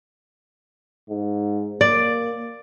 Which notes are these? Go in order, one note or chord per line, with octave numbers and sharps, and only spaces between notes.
G#2
A#3 D5